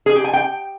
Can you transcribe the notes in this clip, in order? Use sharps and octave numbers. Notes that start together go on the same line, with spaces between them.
G#4
G4
G#5
G5